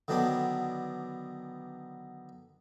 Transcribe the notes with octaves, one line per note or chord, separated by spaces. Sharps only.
D3 D#3 F#3 B3 D4